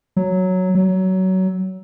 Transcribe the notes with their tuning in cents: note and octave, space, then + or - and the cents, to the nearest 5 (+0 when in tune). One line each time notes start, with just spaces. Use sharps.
F#3 +0
F#3 +20